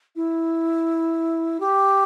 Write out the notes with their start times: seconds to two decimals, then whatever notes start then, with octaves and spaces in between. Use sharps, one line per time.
0.16 E4
1.60 G4